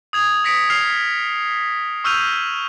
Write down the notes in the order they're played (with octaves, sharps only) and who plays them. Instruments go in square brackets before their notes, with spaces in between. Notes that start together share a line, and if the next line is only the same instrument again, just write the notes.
[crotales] D#6 G#6 F7
D#6 A#6 B6 C#7 D7
F6 C7 F7
C#6 E6 F6 G6 D#7 F7